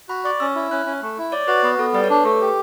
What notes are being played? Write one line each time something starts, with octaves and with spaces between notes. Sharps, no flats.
F#4 B5
D5 C#6
C#4 E6
E4
C#4 F#6
C#4
A3
E4
C#5 D5
F#4 B4
B3 B4
B3 A4
G3 B4
C#5
D4 B4
A3 A4
G4